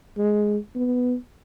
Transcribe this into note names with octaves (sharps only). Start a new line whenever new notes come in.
G#3
B3